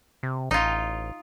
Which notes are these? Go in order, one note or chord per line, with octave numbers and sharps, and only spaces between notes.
C3
A1 D#4 F4